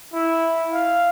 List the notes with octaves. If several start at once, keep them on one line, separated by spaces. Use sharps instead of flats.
E4
F5